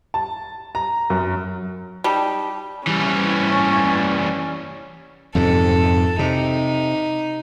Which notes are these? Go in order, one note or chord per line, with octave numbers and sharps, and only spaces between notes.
A5
A#5
F#2
G3 D#4 G4 A5
E3 G3 C#4
F2 G#2 C3 A4
C3 D#4